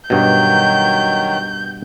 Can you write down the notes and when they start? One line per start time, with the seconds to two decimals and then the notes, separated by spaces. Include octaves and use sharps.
0.10 G2 B2 D#3 F#3 G6